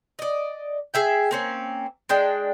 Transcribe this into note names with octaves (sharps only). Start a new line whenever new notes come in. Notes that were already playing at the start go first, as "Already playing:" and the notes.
D5 D#5
G#4 E5 G5
A#3 C4 C#4
G#3 D4 G5